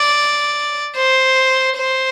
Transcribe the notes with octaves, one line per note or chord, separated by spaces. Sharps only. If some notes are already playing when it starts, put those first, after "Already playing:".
Already playing: D5
C5
C5